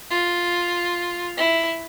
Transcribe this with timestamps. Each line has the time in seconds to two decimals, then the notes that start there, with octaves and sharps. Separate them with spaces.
0.10 F4
1.37 E4